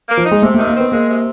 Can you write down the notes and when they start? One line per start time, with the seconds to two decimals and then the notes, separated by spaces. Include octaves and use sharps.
0.09 A#3
0.17 F3
0.26 D#4
0.31 G#3
0.42 C3 A3
0.54 A3
0.59 D#3
0.67 A#3
0.76 B3 C4
0.92 G#3 A#3
1.09 C3